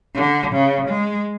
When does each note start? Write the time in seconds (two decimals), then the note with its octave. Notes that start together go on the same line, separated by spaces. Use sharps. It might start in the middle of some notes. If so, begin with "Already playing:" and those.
0.14 D3
0.53 C#3
0.88 G#3